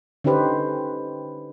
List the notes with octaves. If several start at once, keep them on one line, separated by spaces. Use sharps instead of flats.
D3 C#4 D#4 G4 B4 C5